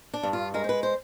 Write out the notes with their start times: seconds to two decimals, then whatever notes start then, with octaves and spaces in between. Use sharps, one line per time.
0.14 D4
0.23 G2
0.33 F4
0.54 G#3 A#4
0.64 C5
0.69 B4
0.83 C5